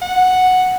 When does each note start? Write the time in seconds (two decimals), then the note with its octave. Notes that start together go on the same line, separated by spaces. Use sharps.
0.02 F#5